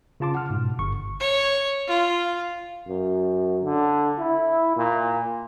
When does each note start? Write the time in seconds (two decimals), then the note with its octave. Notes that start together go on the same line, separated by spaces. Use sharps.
0.20 C#3 C#4 F4 A5 C6 D6
0.35 F#5 F6
0.50 G#2 B2
0.79 G1 C#6
1.20 C#5
1.88 F4
2.87 F#2
3.64 D3
4.18 E4
4.76 A#2